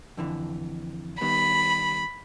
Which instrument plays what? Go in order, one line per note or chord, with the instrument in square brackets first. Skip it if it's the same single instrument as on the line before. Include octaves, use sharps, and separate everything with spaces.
[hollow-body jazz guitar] F2 D3 E3
[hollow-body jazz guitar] D#3 G3 B3 [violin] B5